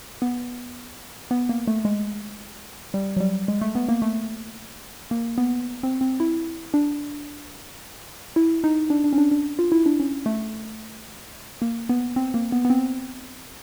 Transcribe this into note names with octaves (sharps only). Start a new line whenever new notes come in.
B3
B3
A#3
A3
G#3
G3
F#3
G3
G#3
A3
B3
A#3
A3
A#3
B3
C4
C4
E4
D4
E4
D#4
D4
D4
C#4
D4
D4
F4
E4
D4
C#4
A3
A#3
B3
C4
A#3
B3
B3
C4